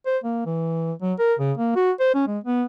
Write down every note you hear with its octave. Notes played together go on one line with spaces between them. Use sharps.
C5
A#3
E3
F#3
A#4
C#3
A#3
F#4
C5
C#4
G#3
B3